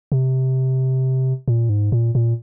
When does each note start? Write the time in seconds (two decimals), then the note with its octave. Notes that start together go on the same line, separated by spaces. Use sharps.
0.12 C3
1.48 A#2
1.69 G#2
1.92 A#2
2.15 A#2